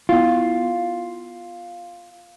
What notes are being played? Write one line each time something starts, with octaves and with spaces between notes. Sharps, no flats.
B3 E4 F4